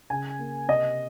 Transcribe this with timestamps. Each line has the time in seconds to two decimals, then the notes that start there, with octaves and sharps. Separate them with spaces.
0.10 C#3 G#5
0.39 A#3
0.68 C3 D#5